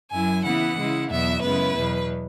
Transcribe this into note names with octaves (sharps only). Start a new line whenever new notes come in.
F#2 F#3 E4 G#5
C#3 E3 B3 E4 F#5
C#3 G#3 E4
E2 B2 F#3 B3 E5
F#2 C#3 G#3 B3 E4 B4
E2 B2 F#3